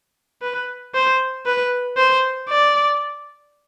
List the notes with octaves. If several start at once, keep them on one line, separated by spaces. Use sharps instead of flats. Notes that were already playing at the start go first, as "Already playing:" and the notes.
B4
C5
B4
C5
D5